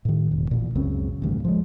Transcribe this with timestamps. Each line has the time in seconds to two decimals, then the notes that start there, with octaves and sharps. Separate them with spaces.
0.05 A2 D#3
0.31 E1
0.51 A1 A#2
0.75 C#2 F#2 C#3 C4
1.22 A1 D2 G2
1.45 F3 G#3